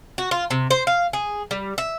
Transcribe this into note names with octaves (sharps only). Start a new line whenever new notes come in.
F#4
F4
C3
C5
F5
G#4
G3
E5